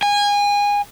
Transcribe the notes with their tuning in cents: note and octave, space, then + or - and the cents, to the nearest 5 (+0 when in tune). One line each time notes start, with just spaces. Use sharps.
G#5 -25